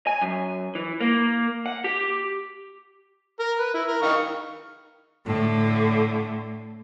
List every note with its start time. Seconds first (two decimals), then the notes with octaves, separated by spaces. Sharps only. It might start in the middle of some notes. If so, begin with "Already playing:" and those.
0.07 G#5
0.21 F#2
0.75 E3
1.01 A#3
1.66 F#5
1.84 G4
3.40 A#4
3.59 B4
3.74 E4
3.88 A#4
4.02 D#3 F5 C#6
5.26 A2 D3